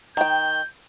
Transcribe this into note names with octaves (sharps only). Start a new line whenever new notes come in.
D#3 G5 G6